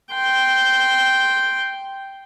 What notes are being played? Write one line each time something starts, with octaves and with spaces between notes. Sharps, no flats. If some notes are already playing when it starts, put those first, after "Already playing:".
G5 C6